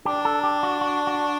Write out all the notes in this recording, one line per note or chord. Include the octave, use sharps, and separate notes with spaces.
D4 G4
A4
G4
F#4
F#4
F#4